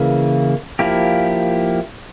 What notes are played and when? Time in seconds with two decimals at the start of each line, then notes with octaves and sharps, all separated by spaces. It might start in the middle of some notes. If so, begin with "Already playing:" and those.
Already playing: C#3 E3 A#3
0.79 F3 A#3 E4 G4